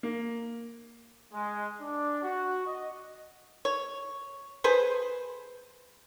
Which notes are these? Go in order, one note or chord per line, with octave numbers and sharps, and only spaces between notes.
A#3
G#3
D4
F#4
D#5
C#5
G#4 B4 C5